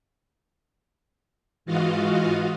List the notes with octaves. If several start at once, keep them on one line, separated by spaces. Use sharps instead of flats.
G#2 E3 F4 F#4 D#5 F5